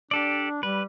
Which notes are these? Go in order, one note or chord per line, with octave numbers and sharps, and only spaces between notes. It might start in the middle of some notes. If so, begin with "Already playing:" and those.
D4 G4 A4 D5
G3 B4